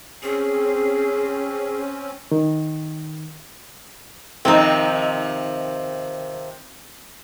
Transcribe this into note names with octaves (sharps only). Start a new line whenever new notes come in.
C4 C#4 G#4
D#3
C3 D#3 F3 C4 D#4